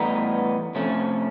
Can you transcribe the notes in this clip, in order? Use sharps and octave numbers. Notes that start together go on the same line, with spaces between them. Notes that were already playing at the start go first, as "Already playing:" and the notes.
Already playing: A2 E3 G3 B3 D#4
C3 F3 A3 C#4